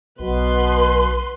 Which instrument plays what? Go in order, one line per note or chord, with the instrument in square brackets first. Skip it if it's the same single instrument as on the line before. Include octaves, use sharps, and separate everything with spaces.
[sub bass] B1 [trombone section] B2 [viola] B4 C6